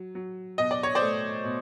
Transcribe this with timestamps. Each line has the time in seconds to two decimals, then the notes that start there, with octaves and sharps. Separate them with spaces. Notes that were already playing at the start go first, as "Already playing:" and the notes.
Already playing: F#3
0.15 F#3
0.58 B2 D#5
0.71 D5
0.83 C#5
0.95 C5 D5
1.02 A3
1.45 B2